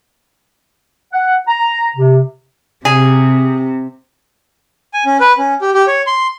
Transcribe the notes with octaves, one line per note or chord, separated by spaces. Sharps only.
F#5
A#5
C3
C3 G#4
G#5
C#4
B4
C#4
G4
G4
C#5
C6